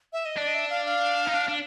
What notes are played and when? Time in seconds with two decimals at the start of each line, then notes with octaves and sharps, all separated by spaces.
0.13 E5
0.25 D#5
0.38 D4 D5
0.47 D#5
0.54 E5
0.70 F5
0.86 F5
1.27 D#4
1.34 D4
1.48 D4